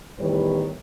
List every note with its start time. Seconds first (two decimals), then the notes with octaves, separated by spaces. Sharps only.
0.19 E2 A2 D#3 G3 B4 C#5